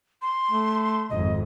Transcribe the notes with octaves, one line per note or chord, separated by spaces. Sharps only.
C6
A3
G#1 F2 D#5